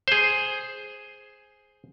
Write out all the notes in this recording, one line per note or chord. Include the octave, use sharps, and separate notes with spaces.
G#4 C5